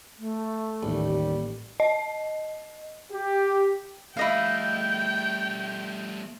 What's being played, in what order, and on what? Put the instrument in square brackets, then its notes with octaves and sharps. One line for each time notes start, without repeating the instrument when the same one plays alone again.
[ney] A3
[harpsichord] A1 [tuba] D#2 [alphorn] G3
[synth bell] D#5
[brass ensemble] G4
[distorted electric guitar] G3 A3 [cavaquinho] E4 D#5 F5 [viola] G5